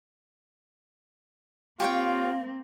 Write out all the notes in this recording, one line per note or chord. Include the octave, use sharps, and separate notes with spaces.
A#3 C4 F4 G4 C#5 F5 G5